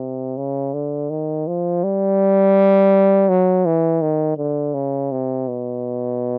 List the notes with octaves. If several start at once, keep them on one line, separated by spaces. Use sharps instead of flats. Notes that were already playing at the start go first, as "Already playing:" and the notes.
Already playing: C3
C#3
D3
D#3
F3
G3
F#3
E3
D#3
D3
C#3
C3
B2